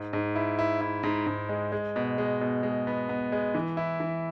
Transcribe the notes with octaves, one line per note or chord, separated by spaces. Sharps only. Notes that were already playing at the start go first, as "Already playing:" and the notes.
Already playing: G#2
G#2
E4
E4
E4
G#2
G#2
G#3
G#3
B2
G#3
B2
G#3
B3
B3
G#3
E3
E4
E3